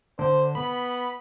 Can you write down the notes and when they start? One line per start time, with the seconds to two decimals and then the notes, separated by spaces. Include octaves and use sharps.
0.19 D3 C5
0.55 B3 B5